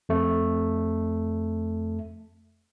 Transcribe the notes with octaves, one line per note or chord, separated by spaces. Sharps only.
F2 A3